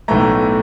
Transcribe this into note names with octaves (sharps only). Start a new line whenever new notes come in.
B1 A2 E3 A3 A#5